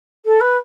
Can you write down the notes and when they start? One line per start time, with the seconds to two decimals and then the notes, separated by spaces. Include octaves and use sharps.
0.25 A4
0.40 B4